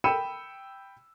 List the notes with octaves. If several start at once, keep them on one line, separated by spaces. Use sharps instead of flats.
G5 B5 E6 C#7 D#7 E7